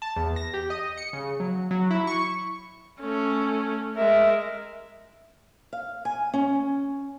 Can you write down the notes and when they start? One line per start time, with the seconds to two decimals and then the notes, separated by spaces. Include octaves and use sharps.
0.02 A5
0.16 E2
0.36 A#6
0.54 G4
0.70 D#5
0.98 C#7
1.13 C#3
1.40 F#3
1.71 F#3
1.91 E4
2.07 C#6
3.00 A3 C#4
3.96 G#3 A#4 E5
5.73 F5
6.05 G#5
6.34 C#4